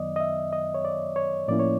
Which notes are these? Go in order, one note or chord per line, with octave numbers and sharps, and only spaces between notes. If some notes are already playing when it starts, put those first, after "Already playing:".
Already playing: F#2 D#3 F#3 B3 D5 D#5
D#5
E5
D#5
C#5
D5
C#5
A2 F3 A#3 C#4 E4 D5
C#5